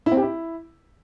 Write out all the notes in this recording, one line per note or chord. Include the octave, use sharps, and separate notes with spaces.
E4
C4
G4
E4